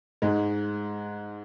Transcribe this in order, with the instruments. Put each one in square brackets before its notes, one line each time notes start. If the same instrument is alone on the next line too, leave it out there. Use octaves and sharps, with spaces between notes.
[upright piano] G#2 G#3